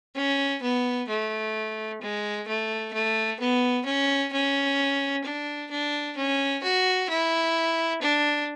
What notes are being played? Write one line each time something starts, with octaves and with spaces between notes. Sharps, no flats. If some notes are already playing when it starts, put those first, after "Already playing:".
C#4
B3
A3
G#3
A3
A3
B3
C#4
C#4
D4
D4
C#4
F#4
E4
D4